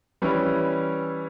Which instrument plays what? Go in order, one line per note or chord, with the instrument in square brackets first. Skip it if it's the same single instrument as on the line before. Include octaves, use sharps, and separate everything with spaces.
[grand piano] E3 G3 C#4 E4